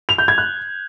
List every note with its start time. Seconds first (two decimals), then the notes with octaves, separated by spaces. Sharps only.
0.09 F7
0.18 G6
0.28 G#6
0.38 F#6